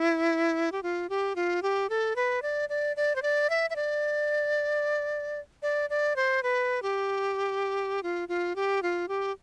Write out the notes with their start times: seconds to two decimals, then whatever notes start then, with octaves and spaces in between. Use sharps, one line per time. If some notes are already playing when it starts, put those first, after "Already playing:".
Already playing: E4
0.72 G4
0.83 F4
1.10 G4
1.36 F4
1.62 G4
1.90 A4
2.16 B4
2.42 D5
2.69 D5
2.96 D5
3.16 C5
3.22 D5
3.50 E5
3.70 E5
3.76 D5
5.62 D5
5.90 D5
6.16 C5
6.43 B4
6.82 G4
8.03 F4
8.29 F4
8.56 G4
8.83 F4
9.08 G4